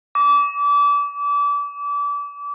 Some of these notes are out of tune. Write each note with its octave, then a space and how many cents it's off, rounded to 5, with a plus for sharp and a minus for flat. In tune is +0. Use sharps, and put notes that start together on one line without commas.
D6 -30